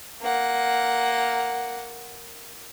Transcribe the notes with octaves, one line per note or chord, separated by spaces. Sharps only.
A#3 F#5